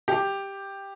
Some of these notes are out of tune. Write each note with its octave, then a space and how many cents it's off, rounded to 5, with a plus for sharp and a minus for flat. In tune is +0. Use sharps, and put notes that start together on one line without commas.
G4 +5